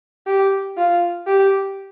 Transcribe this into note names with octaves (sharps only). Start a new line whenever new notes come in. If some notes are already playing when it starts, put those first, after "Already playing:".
G4
F4
G4